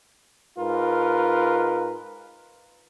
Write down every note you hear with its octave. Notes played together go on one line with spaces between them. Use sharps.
G#2 F4 A#4 B4